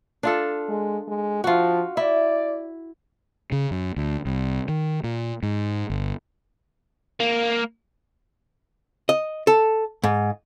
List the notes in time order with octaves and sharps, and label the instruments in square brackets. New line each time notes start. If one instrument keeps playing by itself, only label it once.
[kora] D4 F4 A4
[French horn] G#3
G#3
[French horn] F3 [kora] F4 F#4
[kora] E4 [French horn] D5
[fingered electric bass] C#3
F#2
D2
C2
D#3
A#2
G#2
G1
[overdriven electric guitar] A#3
[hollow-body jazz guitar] D#5
A4
G#2